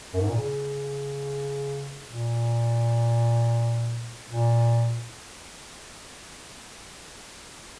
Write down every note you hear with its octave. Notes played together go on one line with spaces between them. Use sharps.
F#2
G#2
A#2
C#3
A#2
A#2